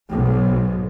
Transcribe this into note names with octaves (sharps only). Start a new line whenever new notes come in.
B1 G#2